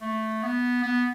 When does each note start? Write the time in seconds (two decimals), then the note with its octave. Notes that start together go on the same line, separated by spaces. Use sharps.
0.01 A3
0.43 B3
0.83 B3